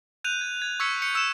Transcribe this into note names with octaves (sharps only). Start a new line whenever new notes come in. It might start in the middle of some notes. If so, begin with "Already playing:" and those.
F#6 G6 D#7 F7
G#6
G#6
C#6 E6 G#6 B6 C#7
G6 C#7
E6 C#7 E7